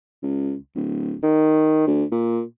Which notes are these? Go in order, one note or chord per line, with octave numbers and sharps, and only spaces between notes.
C#2
D1
D#3
D2
A#2